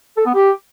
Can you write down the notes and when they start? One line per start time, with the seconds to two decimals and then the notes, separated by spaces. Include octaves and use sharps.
0.17 A4
0.26 B3
0.35 G4